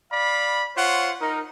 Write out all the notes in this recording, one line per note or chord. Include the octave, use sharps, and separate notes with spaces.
D5 F5 B5
F4 C5 C#5 F#5
D#4 A#4